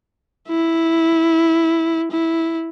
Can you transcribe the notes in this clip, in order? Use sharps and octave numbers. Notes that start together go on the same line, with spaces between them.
E4
E4